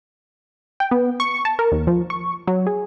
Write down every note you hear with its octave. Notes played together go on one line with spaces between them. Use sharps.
G5
B3
C#6
A5
A#4
D#2
F3
C#6
F#3
G#4